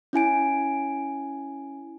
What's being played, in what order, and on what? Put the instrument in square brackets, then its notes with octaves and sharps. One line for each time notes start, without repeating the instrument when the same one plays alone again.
[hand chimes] C#4 E4 G#5 D7